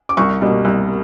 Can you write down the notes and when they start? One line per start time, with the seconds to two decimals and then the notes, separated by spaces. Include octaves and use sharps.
0.09 D6
0.17 C2 C#6
0.41 B2 G3 A#3
0.65 C2